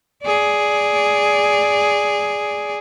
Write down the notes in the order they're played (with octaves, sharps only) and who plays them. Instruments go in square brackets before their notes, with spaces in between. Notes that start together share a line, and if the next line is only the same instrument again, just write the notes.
[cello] G#4 D5